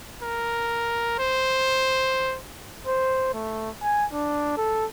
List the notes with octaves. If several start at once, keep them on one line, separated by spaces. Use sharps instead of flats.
A#4
C5
C5
A3
G#5
D4
A4